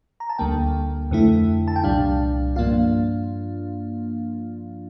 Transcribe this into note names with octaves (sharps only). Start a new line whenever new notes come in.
A#5
A5
D2 D3 G3 A#3 G5
F2 D3 A3 E4
A5
G5
C2 A#2 G3 D4 F5
G2 F3 A#3 D4 F4 F5